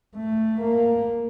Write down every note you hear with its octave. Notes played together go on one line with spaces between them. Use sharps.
A3
A#3